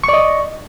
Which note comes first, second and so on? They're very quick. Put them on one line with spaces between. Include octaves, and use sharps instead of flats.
C#6 D5 D#5